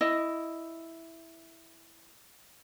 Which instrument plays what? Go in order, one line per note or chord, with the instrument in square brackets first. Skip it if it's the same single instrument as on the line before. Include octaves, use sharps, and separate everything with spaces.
[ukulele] E4 D#5